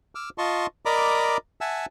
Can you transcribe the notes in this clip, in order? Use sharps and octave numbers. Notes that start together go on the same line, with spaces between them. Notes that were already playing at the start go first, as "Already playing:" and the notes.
D6 E6 F6
F4 D#5 A5 C6 C#6
A#4 D5 D#5 A#5 B5 D6
E5 F#5 G#5 A5 E6